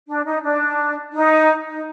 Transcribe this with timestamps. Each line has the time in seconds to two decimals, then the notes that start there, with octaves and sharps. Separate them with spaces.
0.08 D4
0.26 D#4
0.44 D4
1.15 D#4
1.66 D#4